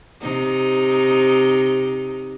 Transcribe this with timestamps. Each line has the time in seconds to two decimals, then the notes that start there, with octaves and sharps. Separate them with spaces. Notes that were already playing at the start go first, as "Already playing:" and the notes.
0.21 C3 D#4